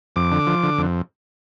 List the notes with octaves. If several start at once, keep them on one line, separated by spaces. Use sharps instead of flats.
F2 D6
D3
F3
D3
F2